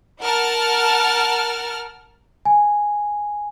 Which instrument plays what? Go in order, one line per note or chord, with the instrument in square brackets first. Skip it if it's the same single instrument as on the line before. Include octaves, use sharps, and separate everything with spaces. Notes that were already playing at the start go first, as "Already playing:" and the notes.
[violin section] A#4 F#5 A5 F6
[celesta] G#5